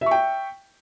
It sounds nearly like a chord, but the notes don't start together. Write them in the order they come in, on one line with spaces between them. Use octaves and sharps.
E5 C#6 G5